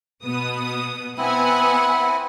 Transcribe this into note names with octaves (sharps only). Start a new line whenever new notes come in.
B2 B3 D#6
B3 C4 E4 F#5 G#5